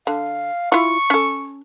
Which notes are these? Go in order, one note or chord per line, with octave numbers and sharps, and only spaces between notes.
D3 F5
E4 F4 C#6
C#4 A4